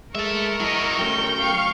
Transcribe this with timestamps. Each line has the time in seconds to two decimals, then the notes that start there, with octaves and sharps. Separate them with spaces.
0.15 G#3 A4 A#4 E5 C#6
0.60 F#3 E4 D#5
0.99 F#3 A3 C#4 G5
1.39 F5 C#6